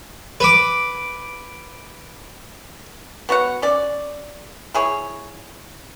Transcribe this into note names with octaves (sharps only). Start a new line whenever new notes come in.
B4 D6
B3 F#4 C#5 F#5
C#4 D5
E4 G#4 C#5